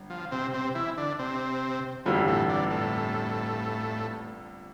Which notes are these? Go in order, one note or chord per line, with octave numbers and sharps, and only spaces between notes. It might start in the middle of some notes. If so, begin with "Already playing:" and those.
Already playing: G1
F3
C3 C4
C3 C4
E3 E4
D3 D4
C3 C4
G1 F2 E3 F3 G3
A2 A3
D3 D4
A2 A3